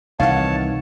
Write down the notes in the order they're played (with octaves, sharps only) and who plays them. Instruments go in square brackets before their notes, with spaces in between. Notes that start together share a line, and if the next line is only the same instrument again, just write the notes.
[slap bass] C2 E3 [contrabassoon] D#3 [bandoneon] C#5 A5 [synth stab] F5 F#5